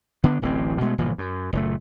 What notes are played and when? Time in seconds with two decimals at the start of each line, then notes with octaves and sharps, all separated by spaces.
0.24 D3 B3 D4
0.42 D1 A1 E3 C4
0.81 B2 G#3 A3
0.98 G1 A#2 E3 F3
1.18 F#2
1.53 F#1 A#2 A3